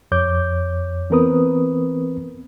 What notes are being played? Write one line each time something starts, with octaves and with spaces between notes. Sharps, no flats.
F2 C#5 D6 G6
E3 B3 C4 A#4 B4 D#6